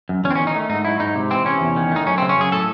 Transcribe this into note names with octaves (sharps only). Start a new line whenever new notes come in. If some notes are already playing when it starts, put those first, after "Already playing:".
F#2
E2 C#4
C4
D#3 C#4
D#4
A3
G#2 D#4
F#3 E4
G#2 D#4
C3
E3 C4
C3 C#4
E2
D#3
A3 D#4
F#2 C#4
C#3 C4
C#4
F#2 G#4
A2 A4